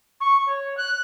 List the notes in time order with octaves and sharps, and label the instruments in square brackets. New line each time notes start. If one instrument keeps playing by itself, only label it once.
[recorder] C#6
C#5
F#6